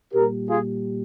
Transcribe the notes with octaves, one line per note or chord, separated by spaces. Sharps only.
A#2 G3 G4 A#4
F4 G#4